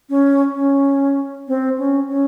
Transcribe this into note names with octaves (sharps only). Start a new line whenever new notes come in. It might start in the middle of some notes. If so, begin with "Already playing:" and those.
C#4
C#4
C4
C#4
C#4